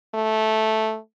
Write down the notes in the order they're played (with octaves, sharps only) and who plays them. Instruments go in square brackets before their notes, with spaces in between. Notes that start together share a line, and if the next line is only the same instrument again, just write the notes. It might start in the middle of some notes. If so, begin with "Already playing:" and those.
[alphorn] A3